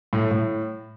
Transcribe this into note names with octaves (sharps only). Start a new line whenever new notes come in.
A2
A2